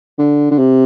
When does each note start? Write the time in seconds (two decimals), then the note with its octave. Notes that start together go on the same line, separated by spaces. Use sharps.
0.18 D3
0.51 D3
0.58 C3